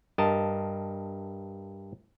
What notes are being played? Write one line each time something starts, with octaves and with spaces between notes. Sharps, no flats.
G2 A#4 D#5 A5